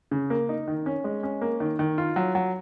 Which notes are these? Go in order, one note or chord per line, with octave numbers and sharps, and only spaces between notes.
C#3
A#3
D#4
D#3
C#4
G#3
C#4
A#3
D#3
D#3
F4
F#3
F#3